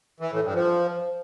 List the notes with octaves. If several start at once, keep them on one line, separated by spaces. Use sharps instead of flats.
E3
A2
G2
F3